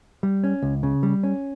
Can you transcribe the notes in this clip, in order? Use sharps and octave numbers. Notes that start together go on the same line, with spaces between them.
G3
C#4
C#2
C#3
G3
C#4